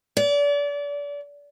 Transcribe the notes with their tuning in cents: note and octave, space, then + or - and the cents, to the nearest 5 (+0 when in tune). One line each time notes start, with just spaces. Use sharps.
D5 -35